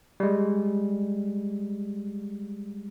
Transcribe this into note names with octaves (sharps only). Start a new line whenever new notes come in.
G3 G#3